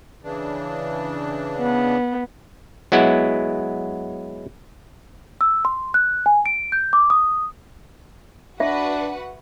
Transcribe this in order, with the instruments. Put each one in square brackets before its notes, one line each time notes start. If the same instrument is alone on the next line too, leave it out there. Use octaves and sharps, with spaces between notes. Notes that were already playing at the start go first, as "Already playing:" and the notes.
[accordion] C#3 E3 D4
[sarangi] B3
[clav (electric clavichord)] F#3 G#3 B3 E4
[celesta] E6
C6
F#6
G#5
D7
G6
D6
D#6
[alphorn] D4 [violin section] F#4 B4 F#5 [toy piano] E5